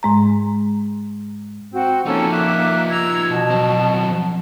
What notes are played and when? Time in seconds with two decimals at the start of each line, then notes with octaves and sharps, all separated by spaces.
0.03 G#2 G#3 A#5
1.73 C4 F#4
2.06 F3 A#3 C#4 D#4 A4 E6
2.31 E5 D6 F#6
2.89 A#5 E6 G#6
3.28 B2 A5
3.50 F#3 C4